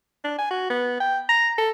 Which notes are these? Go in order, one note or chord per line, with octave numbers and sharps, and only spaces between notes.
D4
G#5
F#4
B3
G5
A#5
A4